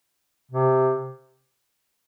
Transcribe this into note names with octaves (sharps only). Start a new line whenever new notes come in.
C3